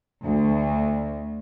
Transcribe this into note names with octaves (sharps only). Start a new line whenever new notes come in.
D2